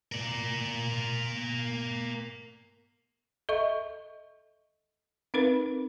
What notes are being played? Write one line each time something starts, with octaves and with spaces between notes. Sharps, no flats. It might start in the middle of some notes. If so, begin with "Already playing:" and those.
A#4 D5
A4 D#5 E5 C#6
C4 D#4 A#4 B4